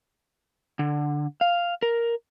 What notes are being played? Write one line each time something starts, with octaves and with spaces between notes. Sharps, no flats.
D3
F5
A#4